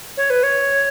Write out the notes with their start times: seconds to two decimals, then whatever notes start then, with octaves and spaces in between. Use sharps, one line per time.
0.17 C#5
0.30 B4
0.43 C#5